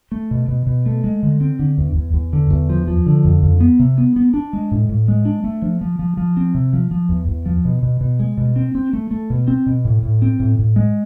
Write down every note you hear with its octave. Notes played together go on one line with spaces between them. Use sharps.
A3
B2
B2
B2
A3
G#3
D3
C4
D3
E2
E2
E2
D3
E2
F3
F3
D3
F2
F2
B3
C3
B3
B3
D4
G#3
A2
A2
G#3
D4
A3
F3
F3
F3
F3
C4
C3
F3
F3
E2
E2
F3
B2
B2
B2
G#3
B2
C4
C4
A3
A3
B2
C4
B2
A2
A2
C4
A2
A2
G#3